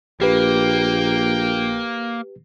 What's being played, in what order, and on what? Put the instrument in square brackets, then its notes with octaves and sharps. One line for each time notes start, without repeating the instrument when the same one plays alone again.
[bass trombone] A#1 [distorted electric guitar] A#3 [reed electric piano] G4 B4 [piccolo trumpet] G5